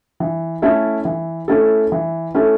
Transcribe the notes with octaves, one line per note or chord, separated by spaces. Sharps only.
E3
A3 C#4 E4 A4
E3
A3 C#4 E4 A4
E3
A3 C#4 E4 A4